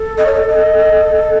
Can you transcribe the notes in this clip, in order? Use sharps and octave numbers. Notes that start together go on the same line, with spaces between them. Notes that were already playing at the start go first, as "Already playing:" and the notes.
Already playing: A4
D#5
C#5
D#5
D#5